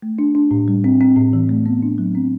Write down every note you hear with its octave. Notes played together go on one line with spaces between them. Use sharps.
A3
D4
D4
A2
G3
C4
C4
A2
E3
A3
B3
D4
F#3
C4